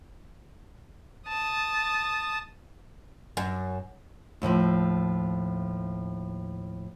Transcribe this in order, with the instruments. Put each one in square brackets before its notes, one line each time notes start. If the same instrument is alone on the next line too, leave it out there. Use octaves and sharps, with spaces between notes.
[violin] A5 D#6
[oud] F#2
[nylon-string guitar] D#2 A2 E3 F3